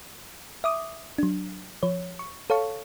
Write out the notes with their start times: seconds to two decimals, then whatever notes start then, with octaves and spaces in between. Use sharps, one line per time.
0.64 E5 D6 D#6
1.18 F#3 D4
1.83 F3 C#5
2.19 C#6
2.50 A4 C#5 F5 A5 C#6